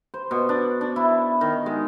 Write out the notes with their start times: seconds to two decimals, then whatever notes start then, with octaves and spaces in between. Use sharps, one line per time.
0.14 C5
0.31 B2
0.49 D4
0.81 D4
0.96 E4
1.41 D#3
1.66 G#3